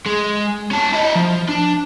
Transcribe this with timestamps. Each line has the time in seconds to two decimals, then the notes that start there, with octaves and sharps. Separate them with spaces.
0.06 G#3
0.71 C#4 A5
0.93 E4 D#5
1.15 F3
1.49 D4